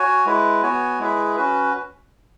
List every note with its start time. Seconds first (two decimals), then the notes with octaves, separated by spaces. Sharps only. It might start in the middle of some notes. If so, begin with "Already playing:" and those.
Already playing: F#4 C#5 G#5
0.26 G#3 E4 B4
0.63 B3 F#4 C#5 G#5
0.99 G#3 E4 G#4 B4 E5
1.36 C#4 F#4 B4